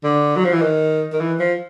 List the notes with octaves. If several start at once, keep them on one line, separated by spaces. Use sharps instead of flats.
D3
F#3
F3
E3
D#3
D#3
E3
F3